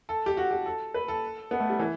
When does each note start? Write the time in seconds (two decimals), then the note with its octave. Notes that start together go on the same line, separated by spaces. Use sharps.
0.09 A4
0.26 G4
0.37 F#4
0.51 G4
0.66 A4
0.94 B4
1.08 A4
1.51 B3
1.60 A3
1.70 G3
1.79 E3